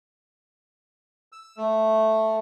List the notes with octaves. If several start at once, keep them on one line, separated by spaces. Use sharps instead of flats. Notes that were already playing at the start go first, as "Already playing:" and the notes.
E6
A3